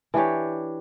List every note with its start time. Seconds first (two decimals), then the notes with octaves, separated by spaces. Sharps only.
0.14 E3 D4 G4 C#5